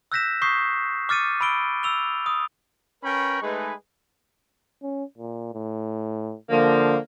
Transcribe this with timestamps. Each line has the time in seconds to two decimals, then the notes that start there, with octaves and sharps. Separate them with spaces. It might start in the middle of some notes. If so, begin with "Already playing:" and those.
0.12 E6 F#6 G6 A#6 B6 E7
0.42 C#6 D#6 G6 B6 C7
1.09 D6 F6 A6 C#7 D#7
1.41 B5 E6 D7 G7
1.83 E6 F7 G7
2.26 D#6
3.03 C#4 A#4 B4 G5 B5 C#6
3.42 G#3 A3 D#4 G#4 B4
4.83 C#4
5.18 A#2
5.54 A2
6.50 D3 F3 A#3